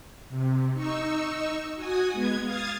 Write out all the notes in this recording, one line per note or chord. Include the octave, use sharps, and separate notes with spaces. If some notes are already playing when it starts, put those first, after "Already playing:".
C3
D#4 C#6 E6
F#4 G#5 D#6
G#3 B3 G#6
F5 D#6 G#6 A6